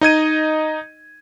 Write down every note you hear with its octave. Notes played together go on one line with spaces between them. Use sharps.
D#4 D#5 G#6 D#7